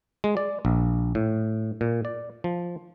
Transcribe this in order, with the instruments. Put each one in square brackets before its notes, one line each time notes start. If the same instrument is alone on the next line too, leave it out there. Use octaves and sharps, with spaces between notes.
[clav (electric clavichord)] G#3
D5
A#1
A2
A#2
D5
F3